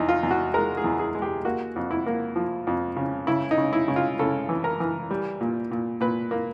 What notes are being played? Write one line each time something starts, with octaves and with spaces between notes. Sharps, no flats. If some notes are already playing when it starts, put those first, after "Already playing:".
Already playing: E2 D#4
F4
E2
F#4
G#3 A#4
G#4
E2
G#4
G#3
G4
A#3 F#4
F2
E4
A#3
F3
F2
C#3
C#3 E4
D#4
C#3
E4
C#3
F4
C#3 A4
E3
A#4
E3
G3
A#2
A#2
A#2 B4
A#3